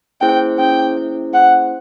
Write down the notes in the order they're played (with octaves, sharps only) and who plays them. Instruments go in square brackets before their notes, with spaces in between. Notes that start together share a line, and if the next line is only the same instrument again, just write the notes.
[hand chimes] A#3 C#4 E4 G#4 C5 [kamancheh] G5
[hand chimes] A#3 C#4 E4 G#4 C5 [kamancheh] G5
[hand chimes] A#3 C#4 E4 G#4 C5
[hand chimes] A#3 C#4 E4 G#4 C5 [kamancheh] F#5